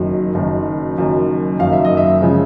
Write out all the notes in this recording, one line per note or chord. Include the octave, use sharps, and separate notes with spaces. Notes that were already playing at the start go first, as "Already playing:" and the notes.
Already playing: F#1 F#2 D#3 F#3
F#1 F#2 D#3 F#3
F#1 F#2 D#3 F#3
F#1 F#2 D#3 F#3 F5
E5
D#5
E5
C#3 F3 G#3